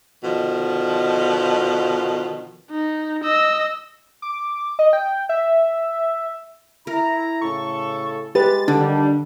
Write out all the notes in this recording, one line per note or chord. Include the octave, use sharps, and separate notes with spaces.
B2 D3 D#3 F3
D#4
D#5 E6
D6
D#5
G5
E5
E4 A#4 A#5
A2 C#3 A4 C#6
G#3 G4 B4 A6
D3 D#3 G3 D4